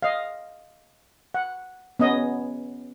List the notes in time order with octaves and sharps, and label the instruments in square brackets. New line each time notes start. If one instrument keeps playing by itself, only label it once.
[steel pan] D#5 F5
F#5
B3 C#4 D#5